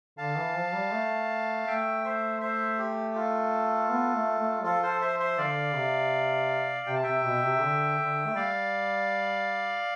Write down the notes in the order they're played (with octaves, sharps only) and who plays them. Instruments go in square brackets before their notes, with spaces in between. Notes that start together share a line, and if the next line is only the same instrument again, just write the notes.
[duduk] D3 [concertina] F5 A5
[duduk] E3
F3
G3
A3
[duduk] A3 [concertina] E5 G5
[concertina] C5 E5
C5 E5
G4
F4 A4
[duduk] B3
A3
A3
[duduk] F3 [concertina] F4 A4
[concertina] A4 C5
C5 E5
C5 E5
[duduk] D3 [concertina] D5 F5
[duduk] C3
[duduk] C3 [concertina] G5
[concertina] A5
[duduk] C3 [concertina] E5 G5
[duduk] B2
C3
D3
D3
A3
[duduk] G3 [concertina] D5 F5